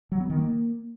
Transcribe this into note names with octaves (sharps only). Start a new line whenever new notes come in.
F#3
B3
D#3
A#3